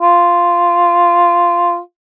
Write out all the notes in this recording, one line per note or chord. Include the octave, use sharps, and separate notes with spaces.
F4